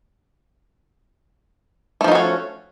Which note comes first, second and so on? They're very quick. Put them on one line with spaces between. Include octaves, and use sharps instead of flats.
A3 F3 D#4 F#4 C#4